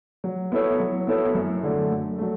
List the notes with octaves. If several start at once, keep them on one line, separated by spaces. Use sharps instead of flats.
F#3
B3 E4 A4 C#5
F#3
B3 E4 A4 C#5
F#2
D3 F#3 A3
F#2
F#3 A3